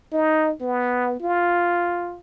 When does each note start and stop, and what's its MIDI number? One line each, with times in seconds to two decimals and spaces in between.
0.13 0.52 63
0.61 1.17 59
1.21 2.18 65